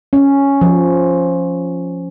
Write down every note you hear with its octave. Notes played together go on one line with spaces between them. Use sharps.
C#4
F3